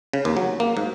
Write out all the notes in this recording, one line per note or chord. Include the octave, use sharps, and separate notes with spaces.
C#3
D#2
F#3
A#3
G#2